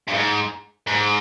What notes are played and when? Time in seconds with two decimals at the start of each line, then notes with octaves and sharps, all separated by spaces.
0.08 G2
0.14 G#2
0.87 G#2